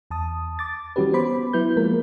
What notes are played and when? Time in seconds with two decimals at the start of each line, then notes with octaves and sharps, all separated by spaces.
0.11 E2 A5 D#6
0.59 D6 A6
0.96 E3 G3 C#4 F#4 G4 B4
1.13 B3 C5 B5 D6
1.53 F#3 B3 E4 B4 G6
1.76 F3 G#3 A#3 A#4